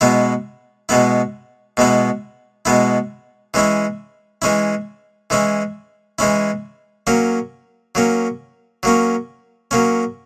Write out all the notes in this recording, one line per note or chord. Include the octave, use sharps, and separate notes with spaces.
B2 G#3 B3 E4
B2 G#3 B3 E4
B2 G#3 B3 E4
B2 G#3 B3 E4
E3 G#3 C#4 E4
E3 G#3 C#4 E4
E3 G#3 C#4 E4
E3 G#3 C#4 E4
F#3 A#3 C#4
F#3 A#3 C#4
F#3 A#3 C#4
F#3 A#3 C#4